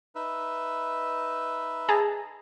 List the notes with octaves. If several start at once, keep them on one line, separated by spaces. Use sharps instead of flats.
D#4 B4 E5
G#4 A5 A#5